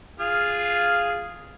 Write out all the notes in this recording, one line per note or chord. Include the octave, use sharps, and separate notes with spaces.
F4 G#4 F5